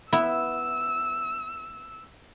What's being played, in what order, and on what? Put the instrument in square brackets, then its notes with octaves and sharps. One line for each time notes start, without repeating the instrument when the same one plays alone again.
[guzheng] B3 E4 [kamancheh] E6